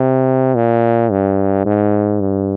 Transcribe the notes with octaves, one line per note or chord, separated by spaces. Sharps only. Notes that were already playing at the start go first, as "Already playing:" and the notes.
Already playing: C3
A#2
G2
G#2
G2